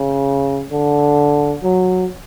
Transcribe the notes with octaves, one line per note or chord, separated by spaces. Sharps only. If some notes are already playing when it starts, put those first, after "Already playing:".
Already playing: C#3
D3
F#3